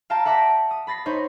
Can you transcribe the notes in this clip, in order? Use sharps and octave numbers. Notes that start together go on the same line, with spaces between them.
F5 G5 A5 A#5
E5 F#5 A5 D6 A#6 B6
D#6
B5 A6 A#6 C7
D#4 C5 C#5 B5